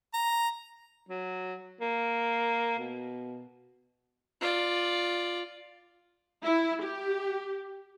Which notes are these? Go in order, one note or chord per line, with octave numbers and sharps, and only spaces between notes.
A#5
F#3
A#3
B2
F4 D5
E4
G4